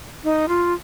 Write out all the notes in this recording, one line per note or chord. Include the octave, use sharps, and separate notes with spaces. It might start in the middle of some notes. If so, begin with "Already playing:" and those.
D#4
F4